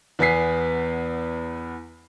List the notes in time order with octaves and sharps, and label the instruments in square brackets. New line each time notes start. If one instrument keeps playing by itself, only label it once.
[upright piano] E2 B3 G#5 B6 C7